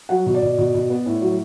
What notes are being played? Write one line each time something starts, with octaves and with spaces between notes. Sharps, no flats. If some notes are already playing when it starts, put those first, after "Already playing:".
F#3 F#5
B2
D5
B2
B2
B2
B3
A2
F#3